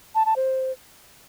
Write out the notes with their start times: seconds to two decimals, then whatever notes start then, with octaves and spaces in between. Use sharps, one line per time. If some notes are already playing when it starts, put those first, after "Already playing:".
0.15 A5
0.26 A5
0.36 C5